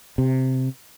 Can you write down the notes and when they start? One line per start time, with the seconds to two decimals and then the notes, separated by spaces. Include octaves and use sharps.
0.18 C3